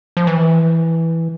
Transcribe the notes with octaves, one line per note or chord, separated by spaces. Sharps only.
F3
E3